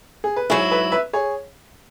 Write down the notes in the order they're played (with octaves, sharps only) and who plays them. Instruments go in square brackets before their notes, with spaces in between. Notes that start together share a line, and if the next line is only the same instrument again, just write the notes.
[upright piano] G#4
B4
[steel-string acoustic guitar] G#2 F#3 E4 [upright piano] G#4 C#5
[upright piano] B4 E5
B4 E5
G#4 C#5